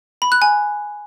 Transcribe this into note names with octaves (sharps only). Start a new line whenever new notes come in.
B5
F#6
G#5